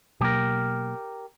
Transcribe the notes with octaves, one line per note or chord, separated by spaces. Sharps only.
B2 F#3 A#3 G4 A#4